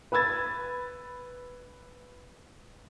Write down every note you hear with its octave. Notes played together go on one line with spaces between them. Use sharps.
B4 B5 E6 G#6 A6